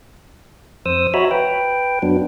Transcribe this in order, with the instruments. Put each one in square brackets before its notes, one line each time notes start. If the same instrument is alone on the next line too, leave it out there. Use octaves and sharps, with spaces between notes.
[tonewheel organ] F2 C5 D#6 E6
F#4 C#5 D#5 E5 A#5 B5
B4 G5
F#2 F#3 B3 D4